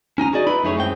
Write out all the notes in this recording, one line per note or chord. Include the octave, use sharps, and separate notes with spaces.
C#4 D#4 G#5 A#5
F#4 G#4 D5 D#5
D#4 E4 B4 B5
F#2 A3 E4 G#4 C#5
F#2 G#3 C4 G5